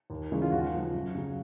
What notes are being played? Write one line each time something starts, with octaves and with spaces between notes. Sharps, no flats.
D#2
C#3 E3 G#3 C#4
F4
D#2 F#4
C#3 F3
F#2
C#3 F#3